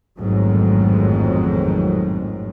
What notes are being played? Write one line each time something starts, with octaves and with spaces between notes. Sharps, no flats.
A1 F2 G#2 B2 D#3 F#3